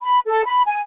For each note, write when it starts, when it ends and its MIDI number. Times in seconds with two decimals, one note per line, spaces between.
0.03 0.20 83
0.27 0.43 69
0.46 0.62 83
0.66 0.80 80